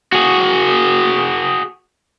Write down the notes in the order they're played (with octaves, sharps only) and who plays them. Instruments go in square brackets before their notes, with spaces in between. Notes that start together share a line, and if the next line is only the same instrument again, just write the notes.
[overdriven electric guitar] F#4 G#4